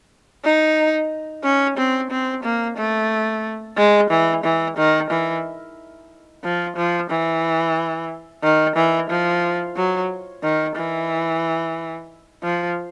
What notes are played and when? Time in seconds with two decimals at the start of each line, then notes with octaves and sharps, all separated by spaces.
0.44 D#4
1.44 C#4
1.77 C4
2.10 C4
2.43 A#3
2.77 A3
3.77 G#3
4.10 E3
4.44 E3
4.77 D#3
5.10 E3
6.43 F3
6.76 F3
7.10 E3
8.43 D#3
8.76 E3
9.10 F3
9.76 F#3
10.43 D#3
10.76 E3
12.43 F3